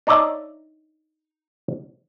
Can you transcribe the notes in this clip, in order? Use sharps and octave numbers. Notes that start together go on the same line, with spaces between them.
D4 D#4 C#5 D5 E5